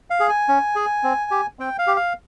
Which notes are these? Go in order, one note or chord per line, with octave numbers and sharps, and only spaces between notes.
F5
G#4
G#5
C#4
G#4
C4
G4
C4 G5
F5
G4
F5